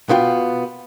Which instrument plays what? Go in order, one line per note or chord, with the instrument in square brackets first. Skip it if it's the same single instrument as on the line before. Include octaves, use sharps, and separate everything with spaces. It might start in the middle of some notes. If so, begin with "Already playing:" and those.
[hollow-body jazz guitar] B2 B3 F4 G5